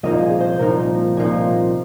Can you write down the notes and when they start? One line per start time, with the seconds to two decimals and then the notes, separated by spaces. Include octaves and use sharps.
0.03 C2 A#2 F3 A#3 D#4 D#5
0.23 G#4
0.40 C5
0.59 C2 A#2 F3 A#3 D#4 A#4
1.17 C2 A#2 F3 A#3 D#4